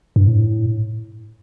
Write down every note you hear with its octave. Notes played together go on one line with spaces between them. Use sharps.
G2
A2